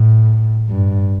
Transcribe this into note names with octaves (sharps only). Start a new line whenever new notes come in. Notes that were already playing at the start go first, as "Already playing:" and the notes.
Already playing: A2
G2